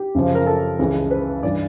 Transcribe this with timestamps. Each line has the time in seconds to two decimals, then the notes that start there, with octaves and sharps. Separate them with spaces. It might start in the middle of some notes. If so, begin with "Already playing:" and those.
Already playing: G4
0.15 F#2 C#3 F3
0.35 A#4
0.47 A4
0.79 C#2 C#3 E3
1.11 B4
1.43 G2 E3 D5